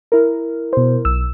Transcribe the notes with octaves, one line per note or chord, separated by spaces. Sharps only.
E4 A#4
B2 C5
B1 E6